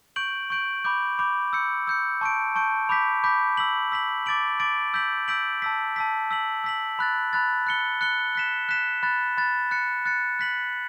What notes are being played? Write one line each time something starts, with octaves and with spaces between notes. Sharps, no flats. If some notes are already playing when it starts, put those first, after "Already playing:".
C#6 G6 D7 F#7
C#6 G6 D7 F#7
B5 D6 G6
B5 D6 G6
E6 G6 C#7
E6 G6 C#7
A5 C#6 G6 D7
A5 C#6 G6 D7
B5 D6 G6 B6
B5 D6 G6 B6
E6 B6 F#7
E6 B6 F#7
D6 A6 D7 F#7
D6 A6 D7 F#7
E6 G6 B6 D7 F#7
E6 G6 B6 D7 F#7
A5 E6 B6
A5 E6 B6
E6 B6 F#7
E6 B6 F#7
B5 F#6 A6
B5 F#6 A6
F#6 C#7 G7
F#6 C#7 G7
F#6 B6 E7
F#6 B6 E7
B5 F#6 A6
B5 F#6 A6
F#6 A6 C#7
F#6 A6 C#7
F#6 B6 F#7